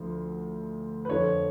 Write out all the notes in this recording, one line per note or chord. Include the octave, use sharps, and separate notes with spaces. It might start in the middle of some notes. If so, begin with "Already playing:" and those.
Already playing: D2 D3 F3
B4
F2 D3 F3 C#5